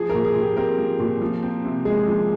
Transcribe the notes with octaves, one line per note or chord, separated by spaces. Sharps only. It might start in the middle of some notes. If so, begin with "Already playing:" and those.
Already playing: F3 G#4
A#2 A#4
G#4
A#2
G4
C4 A#4
F3
A#2
F3
C4
C3
G#3 G#4
F3